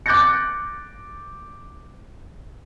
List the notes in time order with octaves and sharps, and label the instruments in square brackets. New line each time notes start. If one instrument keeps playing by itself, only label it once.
[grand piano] D6 F#6 G6 A6 A#6 C#7